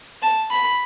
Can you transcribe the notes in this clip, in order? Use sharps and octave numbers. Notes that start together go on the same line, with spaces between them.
A5
B5